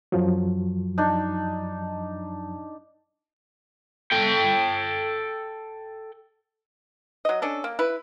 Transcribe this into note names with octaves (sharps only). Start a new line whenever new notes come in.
F#2 F3 F#3
D4 D#4
A4 G5
F#3 D#5
C#4 D4 A4
A#3
E4 B4